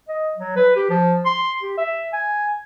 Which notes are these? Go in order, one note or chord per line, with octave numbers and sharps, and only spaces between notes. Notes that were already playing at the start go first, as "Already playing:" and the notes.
D#5
F#3
B4
G4
F3
C6
G4
E5
G#5